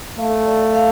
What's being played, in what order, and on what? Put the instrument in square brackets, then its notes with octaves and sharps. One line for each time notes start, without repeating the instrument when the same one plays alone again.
[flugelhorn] A3 [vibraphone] F5
[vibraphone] D5
F5